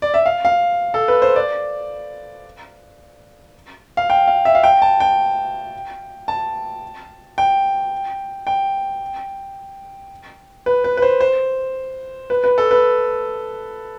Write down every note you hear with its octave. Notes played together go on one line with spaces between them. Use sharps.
D5
E5
F5
F5
A4
B4
C5
D5
F5
G5
F5
E5
F5
G5
A5
G5
A5
G5
G5
B4
B4
B4
C5
C5
B4
B4
A4
B4